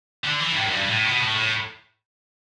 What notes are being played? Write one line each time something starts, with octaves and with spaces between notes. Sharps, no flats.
D3
E3
G2
A2
F#2
G2
A2
B2
A2
A2